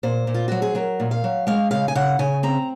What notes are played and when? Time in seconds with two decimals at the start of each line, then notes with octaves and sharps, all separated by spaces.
0.03 A#2 C5
0.27 A#2
0.34 F4
0.48 F#3 F#4
0.62 G#4
0.75 F#3 A#4
1.00 A#2
1.11 F5
1.24 F#3
1.47 G#3 F5
1.71 C#3 F5
1.88 G#5
1.95 C#3 F#5
2.19 C#3 G#5
2.43 C4 A#5